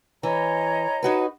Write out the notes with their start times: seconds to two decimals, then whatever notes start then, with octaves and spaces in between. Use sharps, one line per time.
0.23 E3 C#5 D#5 A#5
1.03 D#4 F#4 B4